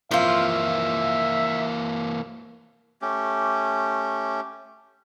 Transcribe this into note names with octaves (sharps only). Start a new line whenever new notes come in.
E3 F3 A#3 F4 E5
A3 C#4 G4